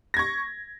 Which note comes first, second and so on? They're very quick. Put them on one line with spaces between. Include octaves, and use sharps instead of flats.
A#6 G#6 C#6